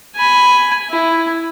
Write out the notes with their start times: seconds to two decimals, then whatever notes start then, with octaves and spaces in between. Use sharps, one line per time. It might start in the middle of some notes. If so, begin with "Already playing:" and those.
0.16 G#5 B5
0.90 E4